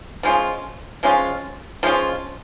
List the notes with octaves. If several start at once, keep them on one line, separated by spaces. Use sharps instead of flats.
F3 G#3 C#4 F4
F3 G#3 C#4 F4
F3 G#3 C#4 F4